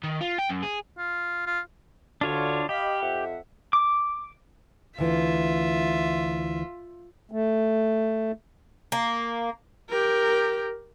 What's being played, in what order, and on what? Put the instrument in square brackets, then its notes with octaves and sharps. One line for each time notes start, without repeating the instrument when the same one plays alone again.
[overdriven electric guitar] D#3
F4
G5
F#2
G#4
[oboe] F4
F4
[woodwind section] D2 D3 [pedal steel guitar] D4 F4 C#5
[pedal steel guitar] G4 [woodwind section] D#5 F5 B5
[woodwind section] F2 E5 F#5
[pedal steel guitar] D6
[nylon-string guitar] D2 E3 [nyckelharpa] F4 E5
[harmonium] A3
[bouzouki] A#3
[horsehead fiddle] G4 A#4